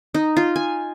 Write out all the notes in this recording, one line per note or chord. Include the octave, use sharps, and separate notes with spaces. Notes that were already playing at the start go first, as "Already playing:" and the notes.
D#4
F4
G#5